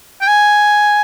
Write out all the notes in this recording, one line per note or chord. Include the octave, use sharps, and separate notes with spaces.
G5
G#5